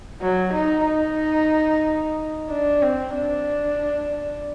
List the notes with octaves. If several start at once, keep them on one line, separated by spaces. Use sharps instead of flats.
F#3
D#4
D#4
D4
C4
D4